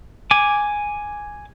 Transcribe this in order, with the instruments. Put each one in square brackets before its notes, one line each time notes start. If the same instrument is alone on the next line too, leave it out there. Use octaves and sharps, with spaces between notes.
[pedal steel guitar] G#5 D6